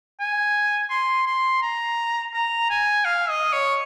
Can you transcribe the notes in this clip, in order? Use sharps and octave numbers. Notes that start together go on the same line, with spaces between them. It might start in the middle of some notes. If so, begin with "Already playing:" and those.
G#5
C6
C6
A#5
A#5
G#5
F5
D#5
C#5